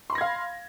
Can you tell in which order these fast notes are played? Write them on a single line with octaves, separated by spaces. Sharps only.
C6 B5 A#6 G#6 F5